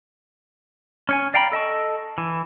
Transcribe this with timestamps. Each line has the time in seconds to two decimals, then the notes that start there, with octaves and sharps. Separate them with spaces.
1.09 C#4 C#5 G#5
1.34 D5 F5 G5 A#5 B5
1.52 A4 D#5 A5 C#6
2.18 E3